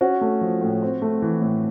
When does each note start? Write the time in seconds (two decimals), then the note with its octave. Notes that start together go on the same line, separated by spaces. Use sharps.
0.01 C#4 F#4
0.21 A3
0.41 F3
0.61 A2
0.82 C4
1.02 A3
1.22 E3
1.41 A2